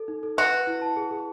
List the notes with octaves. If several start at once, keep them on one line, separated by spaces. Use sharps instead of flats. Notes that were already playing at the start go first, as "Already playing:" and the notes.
Already playing: A4
D#4
A4
F#4 B4
B4
E4
A5
G#4
G#4